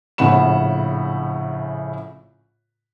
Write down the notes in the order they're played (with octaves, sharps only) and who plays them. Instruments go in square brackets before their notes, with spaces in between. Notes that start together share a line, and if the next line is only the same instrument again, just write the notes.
[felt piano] A#1 A2 C#3 F#5 B5 E7